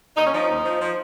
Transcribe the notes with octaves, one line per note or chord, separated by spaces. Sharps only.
D#2 D#4
C#4
F3 D#4
D#2
F3
F3